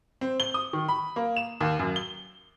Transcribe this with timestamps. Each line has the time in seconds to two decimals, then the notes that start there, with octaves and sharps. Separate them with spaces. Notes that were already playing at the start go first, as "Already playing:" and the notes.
0.21 C4
0.40 G7
0.54 D#6
0.73 D#3
0.88 B5
1.16 A#3
1.36 E7
1.60 D#2
1.79 F#2
1.96 G7